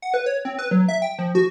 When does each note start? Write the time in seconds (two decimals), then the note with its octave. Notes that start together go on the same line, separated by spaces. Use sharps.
0.02 F#5
0.14 B4
0.26 C#5
0.45 C4
0.59 B4
0.71 F#3
0.88 E5
1.02 G5
1.19 F3
1.35 F#4